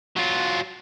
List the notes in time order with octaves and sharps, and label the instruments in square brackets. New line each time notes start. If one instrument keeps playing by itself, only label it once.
[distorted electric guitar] F#3 F4